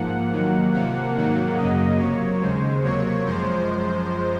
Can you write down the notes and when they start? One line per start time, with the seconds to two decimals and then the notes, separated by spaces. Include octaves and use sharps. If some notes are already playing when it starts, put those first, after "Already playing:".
Already playing: G#2 F3 A#3 F#5
0.32 D#2 D#3 F#3 A#3
0.73 C3 F3 A#3
1.16 G#2 D#3 F#3 A#3
1.57 F#2 C#3 F#3 A#3 D#5
1.99 C3 F#3 A#3 C#5
2.41 D#2 C#3 G#3 C5
2.83 C3 F#3 A#3 C#5
3.25 F#2 F3 G#3 C5